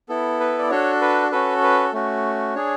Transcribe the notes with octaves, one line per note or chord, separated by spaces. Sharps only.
B3 E4 A4
B4
D5
D4 F#4 A4 C#5
B4
C#4 F#4 A4 B4
B4
A3 C#4 F#4
D4 G#4 C#5